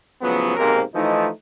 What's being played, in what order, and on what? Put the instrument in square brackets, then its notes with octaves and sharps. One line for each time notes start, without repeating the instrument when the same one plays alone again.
[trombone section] A2 C#3 F3 F#3 B3
B1 G#2 C3 A#3 C4 A#4
E3 F3 A3 D#4